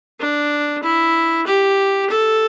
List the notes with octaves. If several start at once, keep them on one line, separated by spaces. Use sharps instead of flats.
D4
E4
G4
A4